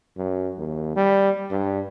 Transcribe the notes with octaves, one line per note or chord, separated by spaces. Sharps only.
F#2
D#2
G3
G2